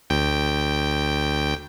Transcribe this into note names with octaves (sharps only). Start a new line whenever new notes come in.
D2 G5